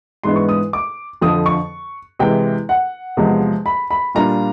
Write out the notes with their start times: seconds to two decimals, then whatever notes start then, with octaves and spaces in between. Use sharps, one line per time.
0.24 G#2 E3 G#3 B3 D4 C6
0.36 C#6
0.49 D#6
0.73 D6
1.21 F2 D3 F3 D#6
1.46 C#6
2.19 C3 E3 G#3 G5
2.69 F#5
3.17 E2 C3 F3 G#3
3.66 B5
3.91 B5
4.15 A#2 G3 A#3 D4 F4 A#5